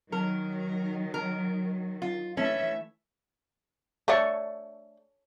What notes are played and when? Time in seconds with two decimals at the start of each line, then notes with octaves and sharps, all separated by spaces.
0.12 D#3 F#3 A#4
1.14 A#4
2.02 F4
2.37 E3 A3 C#4 E5
4.08 A3 D4 A4 C#5 C#6